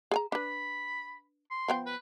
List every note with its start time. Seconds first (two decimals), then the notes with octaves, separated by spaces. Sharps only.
0.11 G#4 G#5 A#5
0.32 D4 B4 B5
1.50 C6
1.68 F3 B3 G5
1.86 B4